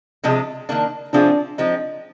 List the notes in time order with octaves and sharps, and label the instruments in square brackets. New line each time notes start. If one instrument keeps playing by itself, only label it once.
[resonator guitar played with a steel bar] C3 F3 G#3 D4 G#4
D#3 A#3 D4
[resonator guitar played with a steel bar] C3 F3 C4 F4 G#4 [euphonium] D4
[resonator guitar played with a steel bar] F3 G#3 C4 D#4